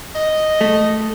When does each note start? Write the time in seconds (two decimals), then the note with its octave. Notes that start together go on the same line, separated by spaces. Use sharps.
0.15 D#5
0.61 A3